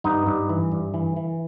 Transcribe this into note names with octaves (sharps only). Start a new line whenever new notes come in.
G2 B3 D#4
G2
E3
G2
E3
E3